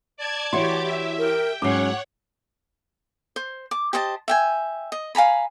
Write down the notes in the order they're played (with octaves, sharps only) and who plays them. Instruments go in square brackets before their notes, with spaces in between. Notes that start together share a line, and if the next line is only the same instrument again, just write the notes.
[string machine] D5 A5 G#6
[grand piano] E3 C6 [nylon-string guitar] E4 F#4 C#5 [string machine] G4 D6
[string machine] E5
[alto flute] A#4 [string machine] G5
[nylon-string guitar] G#2 F#3 [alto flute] C#4 [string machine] C#5 F#5 [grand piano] D6 C7
[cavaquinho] C5
D6
G4 C5 D#5 A5
E5 G5 G#5
D#5
F5 G#5 A#5 B5